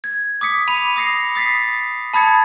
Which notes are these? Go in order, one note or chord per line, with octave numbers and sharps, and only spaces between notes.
G#6
D6 D#6 B6 C#7
B5 D#7 F7
D#6 A#6 C7 C#7
D#6 A6 B6 C7
A5 B5 D#6 G#6 A6 C#7